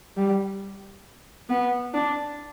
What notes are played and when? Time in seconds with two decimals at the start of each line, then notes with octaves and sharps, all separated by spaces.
0.16 G3
1.49 B3
1.94 D4